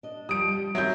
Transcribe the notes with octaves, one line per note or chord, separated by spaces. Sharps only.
D4 D#5
F3 G3 D#6 D7
G3
D#3 F#3 C4 E5 G6